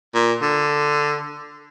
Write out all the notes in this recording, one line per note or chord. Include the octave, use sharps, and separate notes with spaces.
A#2
D3